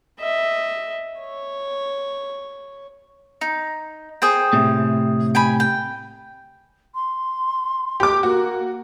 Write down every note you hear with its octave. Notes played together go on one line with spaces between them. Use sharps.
D#5 E5
C#5
D#4
G#4 C5 G5
A2 C3
G5 G#5 B5
G5
C6
G4 D6
A#3 F#4